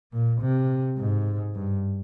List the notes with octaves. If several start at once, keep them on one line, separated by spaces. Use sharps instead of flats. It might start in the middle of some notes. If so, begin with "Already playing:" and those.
A#2
C3
G#2
G2